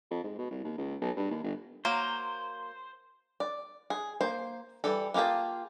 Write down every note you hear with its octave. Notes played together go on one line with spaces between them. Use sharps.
F2
G#2
B2
C2
D#2
C#2
B1
G2
D#2
G1
F#3 A#3 C5
D5
G#4
A#3 C5
E3 G3 A4
A#3 F4 G4 G#4 A5